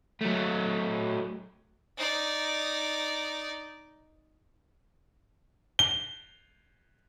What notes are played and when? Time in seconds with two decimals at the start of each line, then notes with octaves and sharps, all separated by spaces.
0.21 F#3 A3
1.97 D#4 D5
5.79 G7